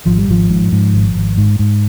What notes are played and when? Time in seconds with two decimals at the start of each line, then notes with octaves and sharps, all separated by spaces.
0.05 G#1 F3
0.18 G3
0.28 G#1 F3
0.50 G#2
0.72 G#2
0.93 G#1
1.15 G#1
1.38 G#2
1.59 G#2